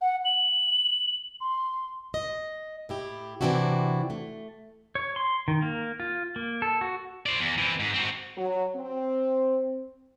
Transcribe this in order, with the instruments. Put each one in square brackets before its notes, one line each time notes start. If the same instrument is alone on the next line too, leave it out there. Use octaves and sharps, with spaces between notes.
[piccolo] F#5
F#7
C6
[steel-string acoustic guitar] D#5
A2 E4 G4
C3 E3 C4 D4 E4 F#4
A3
[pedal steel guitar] C#5
C6
D#3
A#3
F4
A#3
A4
F#4
[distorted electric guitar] C5 D5
E2
E3 C4
G#2
C4 F#4
[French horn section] F#3
C4